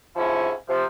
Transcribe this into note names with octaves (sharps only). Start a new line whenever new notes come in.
G#2 C3 F3 C#4 E4
C3 F3